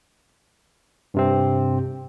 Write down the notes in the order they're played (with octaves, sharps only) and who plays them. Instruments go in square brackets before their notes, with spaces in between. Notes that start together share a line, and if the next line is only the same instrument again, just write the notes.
[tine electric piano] G2 C3 C4